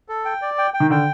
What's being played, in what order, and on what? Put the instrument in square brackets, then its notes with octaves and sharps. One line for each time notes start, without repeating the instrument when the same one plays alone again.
[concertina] A4
G5
D5
G5
G5
[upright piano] D#3
[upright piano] D3 [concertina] G5